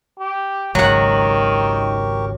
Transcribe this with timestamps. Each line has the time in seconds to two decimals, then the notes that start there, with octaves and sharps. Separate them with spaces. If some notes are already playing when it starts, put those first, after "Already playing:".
0.19 G4
0.75 G#1 C#2 D#3 F#3 G4 A#4 F#5 C#6